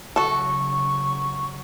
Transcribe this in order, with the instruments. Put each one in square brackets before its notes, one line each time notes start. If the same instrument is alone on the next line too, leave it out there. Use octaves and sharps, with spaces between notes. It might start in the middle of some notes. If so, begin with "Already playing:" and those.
[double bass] C#3 F#3 [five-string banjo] F#4 A4 [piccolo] C#6